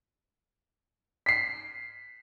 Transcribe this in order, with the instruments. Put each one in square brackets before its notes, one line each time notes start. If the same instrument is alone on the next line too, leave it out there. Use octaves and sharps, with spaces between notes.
[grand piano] B6 C7